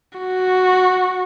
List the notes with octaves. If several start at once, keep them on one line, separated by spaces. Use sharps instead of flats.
F#4